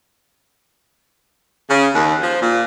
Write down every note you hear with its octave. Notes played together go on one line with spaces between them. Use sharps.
C#3
D#2
F3
A#2